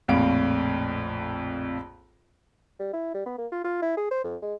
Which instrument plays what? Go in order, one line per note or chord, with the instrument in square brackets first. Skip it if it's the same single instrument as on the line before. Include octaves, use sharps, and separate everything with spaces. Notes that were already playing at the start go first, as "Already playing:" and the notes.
[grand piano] A#1 F2 A2 F5 D7
[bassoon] G3
E4
G3
B3
A#3
F4
F4
E4
G#4
C5
F2
G#3